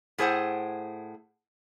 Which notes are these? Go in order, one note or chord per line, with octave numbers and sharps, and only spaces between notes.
A2 G#4 C5 F#5